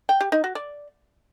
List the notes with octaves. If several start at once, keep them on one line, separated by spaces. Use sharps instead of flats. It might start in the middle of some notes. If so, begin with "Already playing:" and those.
G5
G4
D#4
F#4
D5